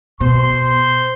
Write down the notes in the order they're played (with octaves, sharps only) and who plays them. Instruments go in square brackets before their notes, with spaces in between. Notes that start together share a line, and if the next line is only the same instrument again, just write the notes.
[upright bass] B2 [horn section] C5 C6